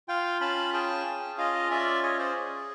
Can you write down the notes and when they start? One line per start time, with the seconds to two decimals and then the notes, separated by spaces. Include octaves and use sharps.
0.08 F4 F5 G5
0.41 C#4 A5 B5
0.73 G#4 G5 A5
1.06 C#4
1.38 F4 D#5 F5
1.71 C#4 D5 E5
2.03 G#4 C#5 D#5
2.19 C5 D5